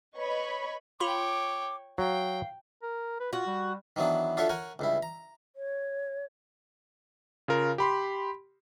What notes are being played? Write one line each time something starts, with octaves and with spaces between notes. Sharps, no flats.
B4 C#5 D#5 B5 C#6
F4 C#5 G5 B5 D6
F#3 F5 G5
A#4
B4
F4 F#4
G3
D#3 E3 F#3 B3 D4
D4 F4 F#4 A4 C#5 E5
A#4 C#5 F#5 G#5
C#2 G2 E4
A#5
C#5
C#3 F4 A#4
G4 B5 C6